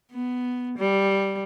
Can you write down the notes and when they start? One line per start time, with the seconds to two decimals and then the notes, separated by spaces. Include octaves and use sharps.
0.12 B3
0.78 G3